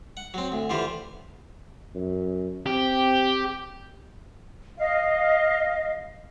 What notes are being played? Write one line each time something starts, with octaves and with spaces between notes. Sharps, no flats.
F#5
F#3 C4
D2
D3 E3 F4 G4 C5
F#2
C4 G4
D#5 F5